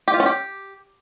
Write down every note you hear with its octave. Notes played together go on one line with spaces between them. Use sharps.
G4
F4
C#4
G4